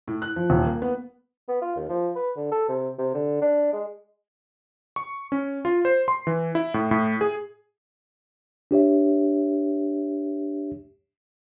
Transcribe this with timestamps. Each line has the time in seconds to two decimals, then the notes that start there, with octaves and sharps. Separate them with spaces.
0.08 A2
0.22 F#6
0.36 F3
0.50 D#1
0.66 A#3
0.82 B3
1.48 B3
1.62 F4
1.76 D#2
1.89 F3
2.15 B4
2.36 D3
2.52 A4
2.68 C3
2.98 C3
3.14 D3
3.41 D4
3.73 G#3
4.96 C#6
5.32 C#4
5.65 F4
5.85 C5
6.08 C6
6.27 E3
6.55 E4
6.74 A2
6.91 A2
7.21 G#4
8.71 D4 G4 C#5 E5